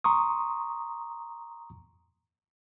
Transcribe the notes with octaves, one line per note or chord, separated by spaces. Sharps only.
A#5 C6 C#6 D#6